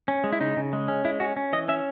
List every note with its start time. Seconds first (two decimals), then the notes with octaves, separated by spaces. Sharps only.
0.08 C#4
0.24 G#3
0.33 E4
0.40 C#3 D#4
0.57 C#3
0.73 G#3
0.88 C#4
1.05 G#3 E4
1.20 C#4 F#4
1.37 C#4
1.53 E3 D#5
1.68 C#4 E5